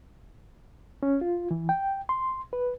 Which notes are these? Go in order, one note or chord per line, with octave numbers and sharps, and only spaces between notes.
C#4
F4
E3
G5
C6
B4